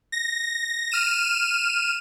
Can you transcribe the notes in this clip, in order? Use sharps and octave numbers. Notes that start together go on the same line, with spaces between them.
A#6
F6 D#7 E7